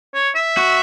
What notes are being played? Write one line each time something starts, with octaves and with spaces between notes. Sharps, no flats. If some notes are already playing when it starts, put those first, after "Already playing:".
C#5
E5
F#4